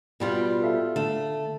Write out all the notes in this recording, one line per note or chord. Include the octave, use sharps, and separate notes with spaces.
B2 G3 F4
A4 E5 F5
D3 A3